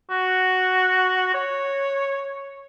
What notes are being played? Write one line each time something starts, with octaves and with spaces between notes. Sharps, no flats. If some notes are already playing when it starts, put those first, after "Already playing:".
F#4
C#5